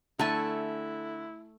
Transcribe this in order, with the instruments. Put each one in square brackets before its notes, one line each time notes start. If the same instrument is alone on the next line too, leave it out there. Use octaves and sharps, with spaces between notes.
[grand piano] D3 [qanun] A3 G#5 C#6 [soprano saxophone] E4 [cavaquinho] A4 A5